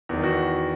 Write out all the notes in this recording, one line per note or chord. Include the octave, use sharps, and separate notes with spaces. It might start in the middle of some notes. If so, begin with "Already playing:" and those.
E2 D#3
F#4